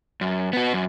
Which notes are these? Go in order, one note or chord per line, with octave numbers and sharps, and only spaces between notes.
F#2
B3 F#4
F#2